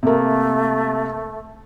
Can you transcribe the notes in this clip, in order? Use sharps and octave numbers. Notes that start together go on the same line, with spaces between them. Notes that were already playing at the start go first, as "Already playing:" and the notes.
C3 A3 A#3